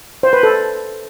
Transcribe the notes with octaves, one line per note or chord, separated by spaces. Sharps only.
C5
B4
A4